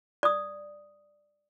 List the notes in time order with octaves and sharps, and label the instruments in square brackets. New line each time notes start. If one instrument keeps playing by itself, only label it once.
[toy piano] D5 D#6